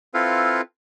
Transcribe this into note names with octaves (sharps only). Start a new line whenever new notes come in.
C4 E4 F4 A4 B4 F5